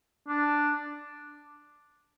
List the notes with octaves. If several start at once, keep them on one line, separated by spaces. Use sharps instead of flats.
D4